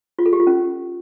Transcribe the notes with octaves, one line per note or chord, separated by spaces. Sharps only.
F4
A4
G4
F4
C#4